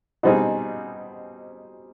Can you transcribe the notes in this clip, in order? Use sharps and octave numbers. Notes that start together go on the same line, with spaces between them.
B2 G3 C4 D#4 G#4